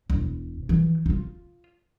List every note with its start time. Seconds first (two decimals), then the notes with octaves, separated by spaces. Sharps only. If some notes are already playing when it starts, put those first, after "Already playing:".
0.10 E1
0.69 E3
1.06 D#4 F4